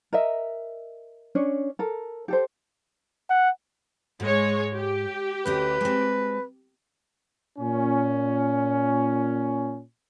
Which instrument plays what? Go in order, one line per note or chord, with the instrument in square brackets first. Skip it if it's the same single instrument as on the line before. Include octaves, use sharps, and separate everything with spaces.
[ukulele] A#4 D#5 E5
C#4 D4 C#5
A4 A#4
G4 A4 C5
[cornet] F#5
[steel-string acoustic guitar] G#2 [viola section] G#3 C#5
[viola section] G4
[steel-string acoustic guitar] D2 C#4 D#5 [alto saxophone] B4
[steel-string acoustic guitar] G#3 C4
[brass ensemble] A#2 C#4